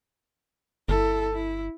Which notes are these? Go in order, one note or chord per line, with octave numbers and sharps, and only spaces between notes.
G1 E4 A4
E4